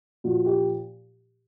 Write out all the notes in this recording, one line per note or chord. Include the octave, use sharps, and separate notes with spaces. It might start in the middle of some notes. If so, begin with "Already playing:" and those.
A#2 F3 F#4
G4